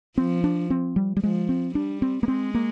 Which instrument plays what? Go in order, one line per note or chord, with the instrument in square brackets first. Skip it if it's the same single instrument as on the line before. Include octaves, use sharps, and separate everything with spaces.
[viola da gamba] F3 [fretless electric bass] C4
[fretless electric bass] D4
C4
G3
G3
[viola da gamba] F3 [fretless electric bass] G#3
[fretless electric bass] C4
[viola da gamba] G3 [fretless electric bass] D4
[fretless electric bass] C4
A#3
[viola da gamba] G#3 [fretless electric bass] C4
[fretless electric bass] A#3